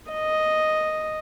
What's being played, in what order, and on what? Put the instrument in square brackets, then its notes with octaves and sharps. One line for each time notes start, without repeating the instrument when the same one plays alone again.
[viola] D#5